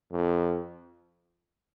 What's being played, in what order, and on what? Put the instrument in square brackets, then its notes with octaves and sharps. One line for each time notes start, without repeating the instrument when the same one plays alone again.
[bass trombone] F2